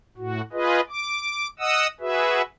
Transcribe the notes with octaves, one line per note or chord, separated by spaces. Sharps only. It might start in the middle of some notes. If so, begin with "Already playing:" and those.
A2 F#4
F4 G#4 B4 D#5
D6
D#5 F#5 D#6 E6
F#4 G#4 B4 E5